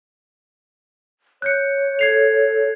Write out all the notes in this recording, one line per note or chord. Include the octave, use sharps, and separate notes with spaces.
C#5 F#6 G6 C#7
A4 G#6 C7 F7